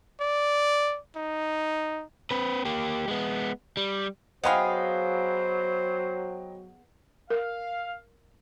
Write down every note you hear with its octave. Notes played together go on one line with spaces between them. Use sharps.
D5
D#4
C4 B4
A#3 G4
G#3 B3
G3
F#3 B3 G#4 C5 D#5 F5 G5 B5
A#4 F5